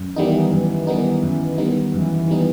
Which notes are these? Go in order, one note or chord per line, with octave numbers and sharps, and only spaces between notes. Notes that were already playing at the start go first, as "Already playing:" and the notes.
Already playing: F#2
D#3 E3 G3 B3 D#4
F#2 E3
D#3 G3 B3 D#4
F#2
D#3 G3 B3 D#4
F#2 E3
D#3 G3 B3 D#4